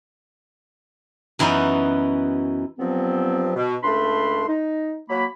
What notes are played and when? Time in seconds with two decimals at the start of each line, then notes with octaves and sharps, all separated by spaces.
1.39 F#2 E3 B3 C#4 D#4
2.79 G2 F3 F#3 B3 C4
3.56 B2
3.83 C#2 A3 D4 B5 C6
4.49 D#4
5.10 F#3 A#3 B5